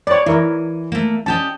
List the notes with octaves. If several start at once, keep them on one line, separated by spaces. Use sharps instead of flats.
B4 C#5 D5
E3 E4 A#4
A3 A#3
C#4 G4 D#5 A5